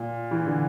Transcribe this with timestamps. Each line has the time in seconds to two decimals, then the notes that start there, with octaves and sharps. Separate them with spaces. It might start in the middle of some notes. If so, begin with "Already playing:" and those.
Already playing: A#2
0.31 E3
0.46 D3